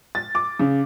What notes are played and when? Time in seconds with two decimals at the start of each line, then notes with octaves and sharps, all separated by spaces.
0.15 A6
0.35 D6
0.59 C#3